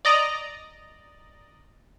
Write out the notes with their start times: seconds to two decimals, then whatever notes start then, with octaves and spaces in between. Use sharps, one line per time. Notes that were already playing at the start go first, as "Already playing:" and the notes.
0.05 D5 D#5 A#5